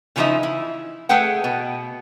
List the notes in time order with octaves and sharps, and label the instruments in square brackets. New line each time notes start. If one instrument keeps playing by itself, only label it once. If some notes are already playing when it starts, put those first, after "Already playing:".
[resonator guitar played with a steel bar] C#3 E3 F3 G#3 D#4 E5
E4
A3 G#4 B4 F#5 G5
B2